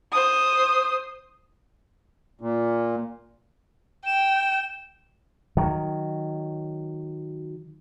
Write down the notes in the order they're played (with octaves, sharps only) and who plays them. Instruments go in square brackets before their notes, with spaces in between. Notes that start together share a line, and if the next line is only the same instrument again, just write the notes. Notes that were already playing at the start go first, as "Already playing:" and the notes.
[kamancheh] C5 D#6
[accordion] A#2
[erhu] G5 [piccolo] E7
[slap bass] D#3 F#3